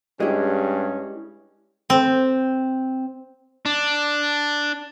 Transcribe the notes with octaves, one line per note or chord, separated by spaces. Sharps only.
G2 G#3 C#4 E4 G4 G#4 D#5
C4
D4